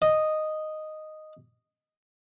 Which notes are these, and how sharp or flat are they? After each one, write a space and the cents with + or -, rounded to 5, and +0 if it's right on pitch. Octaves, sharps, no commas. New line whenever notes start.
D#5 -5